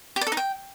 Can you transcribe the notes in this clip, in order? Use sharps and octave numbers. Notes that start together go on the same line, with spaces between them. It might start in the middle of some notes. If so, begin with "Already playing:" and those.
G4
D5
A4
D#4
G5